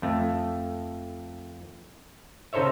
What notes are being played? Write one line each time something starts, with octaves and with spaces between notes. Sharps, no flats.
F2 A3
C#3 D#4 A4 C5 C#5 E5